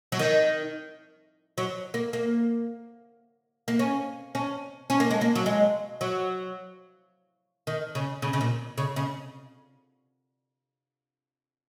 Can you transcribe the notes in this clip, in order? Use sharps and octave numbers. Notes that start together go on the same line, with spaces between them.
F#3
D#3
F#3
A#3
A#3
A#3
C#4
C#4
C#4
A#3
G#3
A#3
F#3
G#3
F#3
D#3
C#3
C#3
C#3
A#2
C#3
C#3